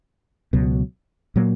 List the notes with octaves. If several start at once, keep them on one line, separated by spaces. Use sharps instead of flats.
C#2 B2 F#3
A#2 F#3 A#3